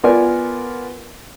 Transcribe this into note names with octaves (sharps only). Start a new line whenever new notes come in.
B3 F4 A#4 D5 G#5